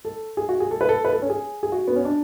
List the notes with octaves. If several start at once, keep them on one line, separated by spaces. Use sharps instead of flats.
A4
G#4
F#4
G#4
A4
B4
A4
B4
A4
C#4
G#4
G#4
F#4
B3
C#4
D4